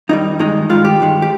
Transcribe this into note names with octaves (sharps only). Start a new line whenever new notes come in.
F2 D#3 G3 D#4
G2 D#3 G#3 D#4
G2 D#3 G#3 F4
G4
G2 D#3 G#3
G4